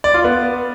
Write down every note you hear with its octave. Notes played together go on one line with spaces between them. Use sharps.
D5
F4
B3